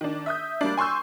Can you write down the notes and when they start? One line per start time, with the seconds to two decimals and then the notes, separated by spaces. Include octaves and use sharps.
0.01 D#3 D4
0.26 E5 D#6 G6
0.61 G3 A#3 D4
0.77 G#5 C6 C#6 E6 G6